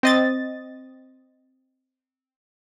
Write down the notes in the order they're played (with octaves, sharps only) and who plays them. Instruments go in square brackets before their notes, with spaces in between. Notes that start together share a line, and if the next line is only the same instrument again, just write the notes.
[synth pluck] C4 D#5 A6